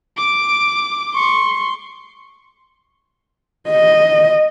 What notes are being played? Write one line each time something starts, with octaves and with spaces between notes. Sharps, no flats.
D6 D7
C6 C#6
D#5